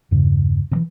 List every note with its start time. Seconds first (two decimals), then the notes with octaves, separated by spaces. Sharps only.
0.11 E2 G2 C#3
0.71 C3 E3